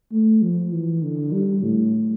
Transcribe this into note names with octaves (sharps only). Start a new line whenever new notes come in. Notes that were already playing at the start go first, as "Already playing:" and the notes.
A3
F3
E3
D3
G3
A2